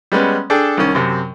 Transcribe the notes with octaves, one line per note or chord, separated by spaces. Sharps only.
G3 G#3 B3 C#4
D4 G#4 A4 G5
C2 D#3 C#4
F#2 C3